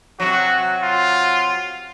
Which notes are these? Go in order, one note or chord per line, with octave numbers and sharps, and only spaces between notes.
C3 F#3 F#4
F4